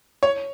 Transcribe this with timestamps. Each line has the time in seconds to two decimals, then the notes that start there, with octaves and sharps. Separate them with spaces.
0.23 C#5